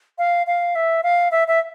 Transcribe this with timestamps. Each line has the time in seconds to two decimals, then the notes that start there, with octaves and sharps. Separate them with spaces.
0.18 F5
0.47 F5
0.75 E5
1.03 F5
1.32 E5
1.48 E5